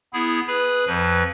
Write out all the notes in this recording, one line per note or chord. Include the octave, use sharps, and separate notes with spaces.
B3 E4 G#4
G#4 B4 B5
F2 F3 B4